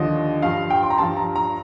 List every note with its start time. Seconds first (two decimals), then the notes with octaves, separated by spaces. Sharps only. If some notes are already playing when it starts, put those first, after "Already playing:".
Already playing: D#2 D3 F3 D#5
0.42 G2 F3 F5
0.71 G5
0.83 C6
0.90 A#5
0.98 G2 F3 A5
1.17 A#5
1.36 A#5